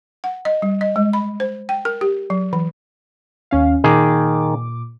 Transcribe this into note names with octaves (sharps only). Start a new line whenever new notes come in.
F#5
D#5
G3
D#5
G#3
B5
C5
G5
A#4
G4
F#3
E3
D#2 C#4 F5
A#2 D#3 G#4 D6